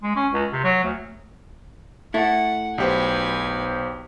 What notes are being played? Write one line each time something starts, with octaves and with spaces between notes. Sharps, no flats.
G#3
C#4
C#2
C3
F#3
D2
A3 E4 F#5
B1 G4 B4 C5 G#5